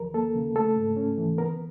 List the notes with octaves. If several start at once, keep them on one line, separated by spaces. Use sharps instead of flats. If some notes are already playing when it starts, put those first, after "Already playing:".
Already playing: D#2 F3 A#4
A#3 A4
C#3
A3 A4
G#2
C#4
E3
B3 A#4